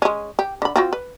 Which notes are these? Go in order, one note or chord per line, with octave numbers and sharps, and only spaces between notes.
G#3 C#4
G4
D3 B5
C4 F4 F#4
B4